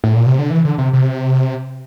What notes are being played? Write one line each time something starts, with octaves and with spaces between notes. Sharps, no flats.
A2
A#2
C3
D3
E3
D3
C3
C3